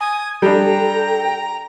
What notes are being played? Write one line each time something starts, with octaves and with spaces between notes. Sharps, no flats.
G#5 D#6 G#6
G3 D4 A4 G5 A#5